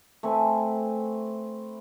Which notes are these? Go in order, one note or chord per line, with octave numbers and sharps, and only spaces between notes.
A3 C4 B4 G#5